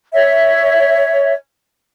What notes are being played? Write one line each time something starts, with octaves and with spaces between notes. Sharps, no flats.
C#5 E5